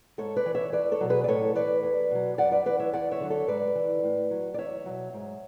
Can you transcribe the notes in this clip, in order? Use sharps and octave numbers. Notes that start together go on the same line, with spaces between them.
G#2 A4 C#5
B4 D5
E3
C#5 E5
E2 B4 D5
A4 C#5
B2 F#3
G#4 B4
D5
A2 A4 C#5
E3 B4 D5
E2
B2 F#3
F#2 D5 F#5
B4 D5
E3 B4 D5
C#5 E5
E2 D5 F#5
C#5 E5
D3 F#3
A4 C#5
G#2 B4 D5
E3
A2
F#3
D5
E2 C#5 E5
B2 F#3
G#2